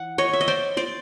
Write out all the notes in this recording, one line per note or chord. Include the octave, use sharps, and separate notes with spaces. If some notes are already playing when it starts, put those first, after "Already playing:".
Already playing: E3 F#5
C#5 D#5
E5
D#5
C5 D5
C5 D5